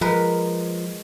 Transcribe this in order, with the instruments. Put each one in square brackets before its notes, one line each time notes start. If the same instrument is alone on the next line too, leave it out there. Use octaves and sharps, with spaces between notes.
[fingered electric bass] F3 [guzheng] G#3 A#4 B4